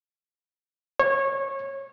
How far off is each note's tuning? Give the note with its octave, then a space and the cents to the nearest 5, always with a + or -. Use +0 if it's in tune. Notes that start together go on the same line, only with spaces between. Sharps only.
C#5 -20